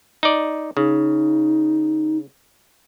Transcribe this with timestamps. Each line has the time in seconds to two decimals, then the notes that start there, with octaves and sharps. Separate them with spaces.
0.23 D#4 D5
0.77 C#3 D#4